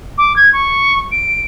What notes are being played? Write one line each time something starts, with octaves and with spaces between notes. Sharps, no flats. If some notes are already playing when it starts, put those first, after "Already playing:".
D6
G#6
C#6
D7